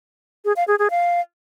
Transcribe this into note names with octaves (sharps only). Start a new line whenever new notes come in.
G#4
F5
G#4
G#4
F5